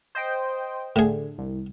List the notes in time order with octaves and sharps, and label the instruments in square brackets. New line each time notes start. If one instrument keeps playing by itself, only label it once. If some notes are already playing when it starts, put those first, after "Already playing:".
[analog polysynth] C5 D#5 G5
[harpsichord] A2 G#4 [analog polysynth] D3
[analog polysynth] C2